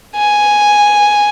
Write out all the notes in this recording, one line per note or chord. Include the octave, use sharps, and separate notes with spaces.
G#5